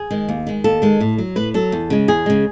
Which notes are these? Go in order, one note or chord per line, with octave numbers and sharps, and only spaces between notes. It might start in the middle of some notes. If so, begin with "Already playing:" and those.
Already playing: G#4
D#3 G#3
D#2
D#3 G#3
D#2 A4
D#3 G#3
A2
F#3
A2 B4
F#3 A4
E2
C#3 G#3
E2 G#4
C#3 G#3